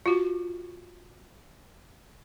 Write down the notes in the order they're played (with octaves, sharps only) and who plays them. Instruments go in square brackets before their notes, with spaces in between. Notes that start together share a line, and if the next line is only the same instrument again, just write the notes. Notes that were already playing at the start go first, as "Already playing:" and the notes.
[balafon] F4 F#4